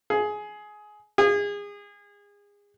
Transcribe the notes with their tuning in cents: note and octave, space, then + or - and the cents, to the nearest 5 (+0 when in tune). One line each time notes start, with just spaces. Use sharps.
G#4 +15
G#4 -30